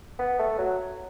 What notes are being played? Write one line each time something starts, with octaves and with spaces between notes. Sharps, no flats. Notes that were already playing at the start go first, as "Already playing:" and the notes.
B3
A3
F#3